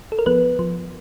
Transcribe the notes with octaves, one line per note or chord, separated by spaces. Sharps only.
A4
A#4
F3 B3 B4
F3